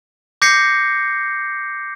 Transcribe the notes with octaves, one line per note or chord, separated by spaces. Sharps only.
D6 G6 A#6 C7 C#7